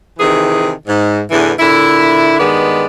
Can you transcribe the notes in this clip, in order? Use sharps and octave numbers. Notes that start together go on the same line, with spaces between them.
C3 D#3 E3 G#4
G#2
E2 A2 D3 E3
A#2 D3 E4
G2 D#3 G#3 B3 D5